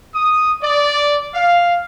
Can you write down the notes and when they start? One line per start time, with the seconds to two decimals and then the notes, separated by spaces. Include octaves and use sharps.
0.14 D#6
0.61 D5
1.34 F5